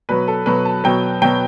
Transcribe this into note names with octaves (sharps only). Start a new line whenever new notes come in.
B2 F#3 B4
A4
B2 F#3 B4
A5
B2 F#3 G5
B2 F#3 G5